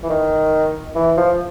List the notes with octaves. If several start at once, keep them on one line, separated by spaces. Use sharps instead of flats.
E3
D#3
E3
F3